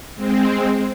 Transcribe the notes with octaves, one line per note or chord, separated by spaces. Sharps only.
G#3 C4